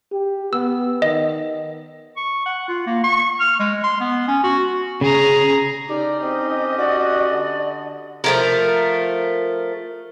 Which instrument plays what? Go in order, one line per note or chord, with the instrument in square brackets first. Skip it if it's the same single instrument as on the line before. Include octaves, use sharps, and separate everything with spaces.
[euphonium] G4
[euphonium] B3 [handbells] E6
[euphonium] D#3 [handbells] D#5
[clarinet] C#6
F#5
F4
A#3
C#6
F6
G#3
C6
B3
C#4
F#4
[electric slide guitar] C#3 [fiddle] G#4 A#5
[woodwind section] A2 C#4 G4 [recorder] D#4 [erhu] D5
[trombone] C4 [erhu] D#5
[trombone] F#4 [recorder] D5
[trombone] D3
[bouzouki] F3 A3 A#4